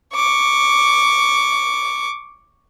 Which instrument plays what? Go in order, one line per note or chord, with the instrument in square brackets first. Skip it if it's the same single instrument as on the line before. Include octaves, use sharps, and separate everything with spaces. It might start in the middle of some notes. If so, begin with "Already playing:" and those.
[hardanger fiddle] C#6 D6